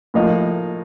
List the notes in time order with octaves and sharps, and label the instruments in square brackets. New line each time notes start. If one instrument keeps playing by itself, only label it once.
[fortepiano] A2 F3 A#3 D#4